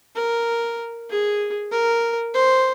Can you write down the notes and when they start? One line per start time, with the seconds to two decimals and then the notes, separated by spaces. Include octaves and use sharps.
0.16 A#4
1.10 G#4
1.72 A#4
2.34 C5